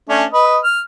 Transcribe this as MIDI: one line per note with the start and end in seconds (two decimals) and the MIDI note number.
0.09 0.25 57
0.09 0.25 61
0.09 0.25 62
0.33 0.58 71
0.33 0.58 75
0.64 0.80 89